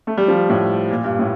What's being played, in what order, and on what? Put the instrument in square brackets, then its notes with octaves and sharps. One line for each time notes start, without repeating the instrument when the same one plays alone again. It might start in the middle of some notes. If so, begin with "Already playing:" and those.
[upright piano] A3
G3
F3
A2
A#2
G2
A2